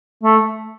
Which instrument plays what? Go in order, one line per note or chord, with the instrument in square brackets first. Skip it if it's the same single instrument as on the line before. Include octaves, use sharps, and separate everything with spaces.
[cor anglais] A3